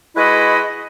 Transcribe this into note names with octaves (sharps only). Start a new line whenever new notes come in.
G#3 E4 F#4 B4 D#5